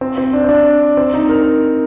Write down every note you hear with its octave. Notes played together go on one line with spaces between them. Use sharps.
C4
C4
D4
C4
D4
C4
D#4
A#4